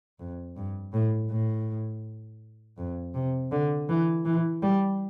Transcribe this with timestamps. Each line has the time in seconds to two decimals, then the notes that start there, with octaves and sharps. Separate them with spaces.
0.19 F2
0.57 G2
0.93 A2
1.31 A2
2.78 F2
3.14 C3
3.52 D3
3.89 E3
4.25 E3
4.62 G3